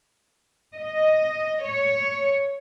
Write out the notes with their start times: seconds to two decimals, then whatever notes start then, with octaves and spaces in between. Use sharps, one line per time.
0.76 D#5
1.64 C#5